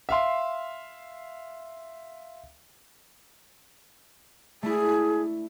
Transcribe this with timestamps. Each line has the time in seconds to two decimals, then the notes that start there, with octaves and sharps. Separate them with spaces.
0.09 E5 F5 C6
4.63 A3 D4 E4 G#4